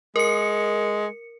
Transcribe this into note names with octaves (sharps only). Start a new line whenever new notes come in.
G#3 A#4 C#7